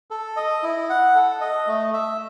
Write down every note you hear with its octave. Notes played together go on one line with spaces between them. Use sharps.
A4
D#5
E4
F#5
A4
D#5
A3
E5